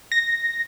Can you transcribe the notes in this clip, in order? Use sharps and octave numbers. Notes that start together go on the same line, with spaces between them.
A#6